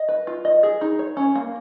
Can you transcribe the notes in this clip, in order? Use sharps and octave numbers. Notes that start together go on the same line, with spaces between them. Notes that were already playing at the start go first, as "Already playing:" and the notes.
Already playing: D#5
B4
F4
D#5
G#4
D#4
C#5
C#4
A#3